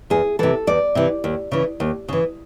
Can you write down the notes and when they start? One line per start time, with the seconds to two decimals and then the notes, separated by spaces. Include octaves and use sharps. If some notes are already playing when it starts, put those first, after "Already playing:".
0.10 E2 G#4
0.39 C3 E3 A4
0.67 E2 D5
0.95 C3 E3
1.24 D#2
1.52 C#3 E3
1.80 D#2
2.08 C#3 E3